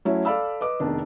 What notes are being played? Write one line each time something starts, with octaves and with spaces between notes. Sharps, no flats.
F#3 A3 C#4 E4
A4 D5 F5 B5 E6
B4 D#5 D6
F1 E2 D#3 D4